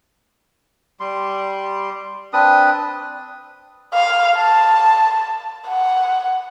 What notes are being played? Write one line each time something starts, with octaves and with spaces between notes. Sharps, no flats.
G3 C6
C4 D4 B4 D#6
F5
A5
F#5